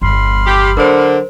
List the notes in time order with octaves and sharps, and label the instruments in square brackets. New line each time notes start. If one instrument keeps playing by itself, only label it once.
[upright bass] G1 E2 [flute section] B5 C6 F6
[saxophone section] G4
[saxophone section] D3 [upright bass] F#3 [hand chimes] A#4 C5